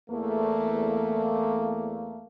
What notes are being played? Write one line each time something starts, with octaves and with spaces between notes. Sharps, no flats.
E2 A3 A#3